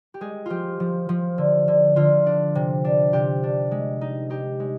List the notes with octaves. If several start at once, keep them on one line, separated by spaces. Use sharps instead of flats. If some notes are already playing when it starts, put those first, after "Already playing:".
G4
G#3 G#4
F3 F4 G4
F3
F3
D3
D3
D3 F4
D4
C3
D4
C3 G4
D4
G#3
D#4
D#4 G4
G#3